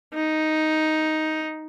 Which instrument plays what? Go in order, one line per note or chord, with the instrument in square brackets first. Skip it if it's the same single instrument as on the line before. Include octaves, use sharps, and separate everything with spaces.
[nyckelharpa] D#4